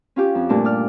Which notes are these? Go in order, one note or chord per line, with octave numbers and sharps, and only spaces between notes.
C#4 F4 G4
F2
G2 A#2 A3 D4
D5 F6